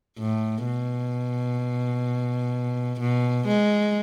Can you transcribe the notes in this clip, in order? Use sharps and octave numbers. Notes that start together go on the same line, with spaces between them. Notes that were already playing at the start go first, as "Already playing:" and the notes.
A2
B2
B2
G#3